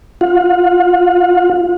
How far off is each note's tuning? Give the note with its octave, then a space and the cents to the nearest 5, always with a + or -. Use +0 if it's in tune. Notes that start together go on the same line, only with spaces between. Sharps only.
F4 +0 F#5 -45